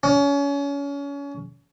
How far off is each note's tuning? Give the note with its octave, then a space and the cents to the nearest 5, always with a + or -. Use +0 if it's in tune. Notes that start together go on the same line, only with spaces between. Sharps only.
C#4 +30